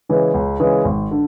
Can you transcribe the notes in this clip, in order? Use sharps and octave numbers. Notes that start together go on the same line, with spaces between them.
C#3 E3 G#3
C#2
C#3 E3 G#3
G#1
D3